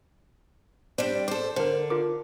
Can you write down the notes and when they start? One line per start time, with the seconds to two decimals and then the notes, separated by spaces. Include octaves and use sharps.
0.98 G3 C4 D4 C5
1.28 A4 C5 D6
1.56 D3 A#4 C5
1.90 F4 A#4 D6